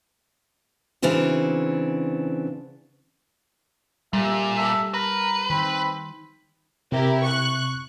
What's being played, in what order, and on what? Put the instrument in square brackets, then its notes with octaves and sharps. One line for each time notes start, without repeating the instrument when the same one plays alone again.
[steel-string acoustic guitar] C#3 E3 C4 D4 F#4
[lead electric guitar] A#2 [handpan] G3 [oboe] A4 [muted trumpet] E5
[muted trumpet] A4 [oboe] E5
[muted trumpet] A#4 [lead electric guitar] B4 [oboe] A#5
[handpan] D#3 [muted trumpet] C4 [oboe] B5
[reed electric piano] C3 [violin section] E4 G4 A#4
[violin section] C#6 F#6